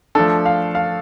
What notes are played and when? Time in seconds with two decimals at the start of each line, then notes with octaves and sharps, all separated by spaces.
0.15 F3 A3 D4 A4
0.46 F5
0.75 F5